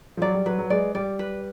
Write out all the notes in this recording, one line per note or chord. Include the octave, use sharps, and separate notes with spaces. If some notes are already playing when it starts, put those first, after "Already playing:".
F3
F#3 D5
G3
F#3 B4
F#3
G#3 D5
G3 D5
B4